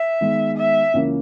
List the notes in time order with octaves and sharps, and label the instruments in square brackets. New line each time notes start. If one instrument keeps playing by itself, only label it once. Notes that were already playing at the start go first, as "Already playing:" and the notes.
Already playing: [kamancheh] E5
[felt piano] D#3 G#3 B3
[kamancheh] E5
[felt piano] C#2 C#3 E3 A#3 C#4